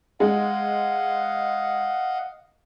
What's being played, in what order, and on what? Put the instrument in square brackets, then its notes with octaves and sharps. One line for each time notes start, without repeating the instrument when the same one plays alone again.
[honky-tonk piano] G#3 [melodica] D#5 F5 F#5